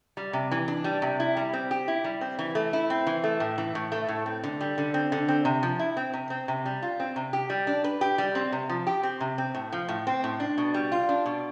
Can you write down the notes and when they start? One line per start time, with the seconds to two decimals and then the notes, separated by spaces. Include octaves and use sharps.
0.17 G3
0.33 C3
0.51 E3
0.68 D4
0.84 G3
1.02 C3
1.20 E4
1.37 G3
1.53 C4
1.71 G4
1.88 E4
2.04 G3
2.21 C4
2.39 E3
2.55 A3
2.73 E4
2.90 C4
3.07 E3
3.24 A3
3.40 A2
3.58 E3
3.75 A2
3.92 A3
4.08 A2
4.26 C4
4.43 D3
4.61 G3
4.78 D3
4.94 C4
5.12 D3
5.28 C4
5.45 C3
5.63 F3
5.79 E4
5.97 C4
6.13 C3
6.30 C4
6.48 C3
6.66 G3
6.82 F4
7.00 C4
7.16 C3
7.33 G4
7.50 G3
7.67 D4
7.84 B4
8.01 G4
8.18 G3
8.35 C4
8.52 C3
8.69 F3
8.87 G4
9.03 C4
9.21 C3
9.38 C4
9.55 A2
9.72 F3
9.88 A2
10.07 C4
10.24 A2
10.40 D4
10.58 B2
10.74 G3
10.92 F4
11.09 D4
11.26 B2